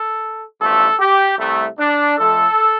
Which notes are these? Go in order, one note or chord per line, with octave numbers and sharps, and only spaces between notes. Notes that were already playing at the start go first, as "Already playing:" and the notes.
Already playing: A4
A1 G2 F3 A3 A4
G4
C2 C3 A3
D4
F2 F3 A3 A4